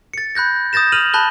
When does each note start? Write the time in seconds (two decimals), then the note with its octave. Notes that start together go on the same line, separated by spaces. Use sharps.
0.14 A6 C#7
0.35 B5 F#6 G6 A#6
0.73 D#6 G6 A6 A#6 E7
0.92 F6 D#7 F7 F#7
1.13 A5 B5 F#6 D#7 G7